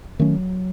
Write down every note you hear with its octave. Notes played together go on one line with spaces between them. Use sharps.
D#3 F#3 A3 C#4